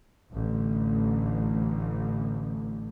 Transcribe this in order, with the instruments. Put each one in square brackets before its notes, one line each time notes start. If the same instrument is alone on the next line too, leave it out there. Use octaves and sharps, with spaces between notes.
[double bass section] A1 D3